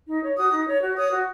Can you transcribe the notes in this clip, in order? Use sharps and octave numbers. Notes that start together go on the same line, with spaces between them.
D#4
C#5
F#4 D#6
D#4
C#5
F#4
C#5 D#6
F#4